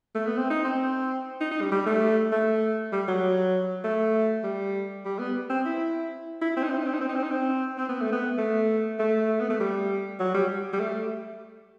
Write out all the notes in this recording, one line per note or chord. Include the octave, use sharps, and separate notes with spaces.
A3
B3
C4
D#4
C4
D#4
D#4
G3
G3
A3
A3
G3
F#3
A3
G3
G3
B3
C4
E4
E4
C4
D#4
C4
D#4
C4
D#4
C4
D#4
C4
D#4
C4
C4
B3
A3
B3
A3
A3
B3
A3
G3
F#3
G3
G3
A3